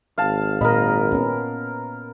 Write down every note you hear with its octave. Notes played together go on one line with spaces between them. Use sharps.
G#1 F5 A5
A#2 A#4 D#5 B5
B3 C#4